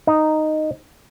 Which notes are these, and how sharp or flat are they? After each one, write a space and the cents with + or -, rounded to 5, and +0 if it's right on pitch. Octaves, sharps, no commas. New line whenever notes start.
D#4 -5